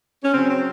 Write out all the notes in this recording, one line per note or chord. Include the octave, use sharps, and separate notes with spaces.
C#4
C#3 F#3 C4
C4